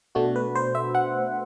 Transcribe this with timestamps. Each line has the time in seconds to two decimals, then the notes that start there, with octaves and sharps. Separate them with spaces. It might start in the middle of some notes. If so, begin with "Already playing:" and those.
0.15 B2 A3 D4 F#4
0.36 B4
0.55 C5
0.75 E5
0.95 F#5